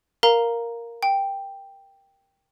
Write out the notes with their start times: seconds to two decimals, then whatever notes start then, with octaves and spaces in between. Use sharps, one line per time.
0.23 A#4 F5 A#5
1.03 G5